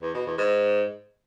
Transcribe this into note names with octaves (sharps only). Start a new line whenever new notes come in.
E2
B2
E2
G#2